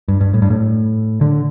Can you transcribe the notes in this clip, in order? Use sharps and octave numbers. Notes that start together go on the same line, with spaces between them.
G2
G2
A2
G2
A2
D3